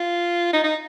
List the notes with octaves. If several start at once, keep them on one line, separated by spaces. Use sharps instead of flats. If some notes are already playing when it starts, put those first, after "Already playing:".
Already playing: F4
D#4
D#4